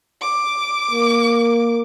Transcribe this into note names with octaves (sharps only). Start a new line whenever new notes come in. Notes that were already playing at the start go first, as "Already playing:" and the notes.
D6
A#3